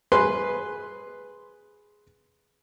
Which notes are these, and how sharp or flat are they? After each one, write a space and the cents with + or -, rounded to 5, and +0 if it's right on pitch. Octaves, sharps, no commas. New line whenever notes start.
G#4 +0 B4 +0 C6 +0